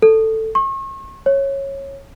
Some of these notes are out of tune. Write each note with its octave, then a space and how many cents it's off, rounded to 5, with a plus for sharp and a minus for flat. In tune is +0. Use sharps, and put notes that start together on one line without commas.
A4 +10
C#6 -40
C#5 -15